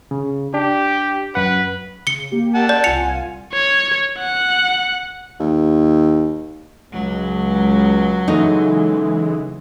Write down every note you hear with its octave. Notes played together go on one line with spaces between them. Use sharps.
C#3
D4 G4
F#2 B4 F#5
C#3 C#7 G7
A#3 G4
F#5 A5
D5
C2 F4 G#5 C#7 F7
C#5
F#5
D#2
C#2 F#3
C#3 E3 G#3 A3 D#4